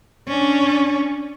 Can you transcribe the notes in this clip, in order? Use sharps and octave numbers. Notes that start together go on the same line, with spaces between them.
C#4 D4